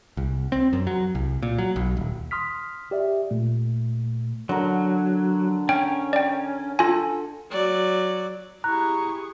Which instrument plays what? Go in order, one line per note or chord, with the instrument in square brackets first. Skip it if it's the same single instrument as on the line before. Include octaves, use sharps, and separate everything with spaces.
[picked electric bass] C2
C4
F#2
F#3
C2
A#2
F#3
B1
D#1
[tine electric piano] C6 D#6 F6 B6
G4 D5 E5
A#2 A3
[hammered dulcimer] D3 A#4 [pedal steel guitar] F#3
[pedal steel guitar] C#4 [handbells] G5
[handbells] D5 G5
[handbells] F4 G#5 [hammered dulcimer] A4
[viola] F#3 D5
[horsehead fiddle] E4 G4 [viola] G#4 C#6 [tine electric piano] A#5 [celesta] F#6